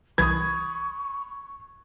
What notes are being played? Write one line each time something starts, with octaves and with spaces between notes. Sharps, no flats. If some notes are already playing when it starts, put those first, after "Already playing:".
C2 E3 B5 C#6 D#6 G#6